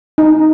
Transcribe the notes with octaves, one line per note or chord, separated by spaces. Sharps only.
D#4